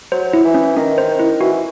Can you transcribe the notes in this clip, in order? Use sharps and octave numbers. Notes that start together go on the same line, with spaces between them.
F#3 C5
E4
E3
C#4
D#3 C#4
C5
E4
E3 F#4